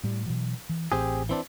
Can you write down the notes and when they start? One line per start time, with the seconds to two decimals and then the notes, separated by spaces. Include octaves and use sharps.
0.04 A2 G3
0.26 B2 E3 F#3
0.69 E3
0.92 A1 C4 G4 G#4
1.29 E3 C4 D4